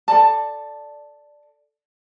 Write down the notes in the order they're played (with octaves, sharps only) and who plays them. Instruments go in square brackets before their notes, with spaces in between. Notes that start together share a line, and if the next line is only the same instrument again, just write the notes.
[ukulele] A4 D5 A5